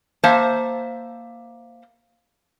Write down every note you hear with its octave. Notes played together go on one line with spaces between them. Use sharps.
A#3 C5 E5 A5